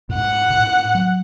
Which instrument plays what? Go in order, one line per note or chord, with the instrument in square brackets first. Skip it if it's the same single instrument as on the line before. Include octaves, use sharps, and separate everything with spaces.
[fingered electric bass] A2
[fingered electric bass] G#2 [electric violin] F#5
[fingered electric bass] B2
A2
F#3